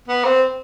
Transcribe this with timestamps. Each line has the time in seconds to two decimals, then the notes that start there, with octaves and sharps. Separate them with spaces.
0.08 B3
0.25 C4